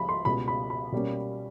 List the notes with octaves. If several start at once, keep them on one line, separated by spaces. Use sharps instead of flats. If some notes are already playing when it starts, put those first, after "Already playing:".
Already playing: C#2 C#3 F3 B5
C6
C#2 B2 G3 B3 B5
B5
B5
B2 G3 A#3 C#4